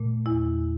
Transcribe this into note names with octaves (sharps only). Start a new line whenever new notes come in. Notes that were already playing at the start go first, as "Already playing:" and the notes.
Already playing: A#2 A3
E2 E4